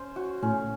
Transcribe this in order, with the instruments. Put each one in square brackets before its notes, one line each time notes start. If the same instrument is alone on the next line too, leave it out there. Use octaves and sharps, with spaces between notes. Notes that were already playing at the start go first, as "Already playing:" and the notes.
Already playing: [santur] C#4 C5
F#4
[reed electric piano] A2 [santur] C#4